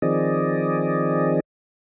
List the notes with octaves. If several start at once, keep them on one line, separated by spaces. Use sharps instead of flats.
D#3 F3 C4 G#4 D5 D#5